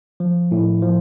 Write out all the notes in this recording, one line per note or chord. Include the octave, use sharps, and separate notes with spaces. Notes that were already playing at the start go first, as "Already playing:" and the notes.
F3
A2
F3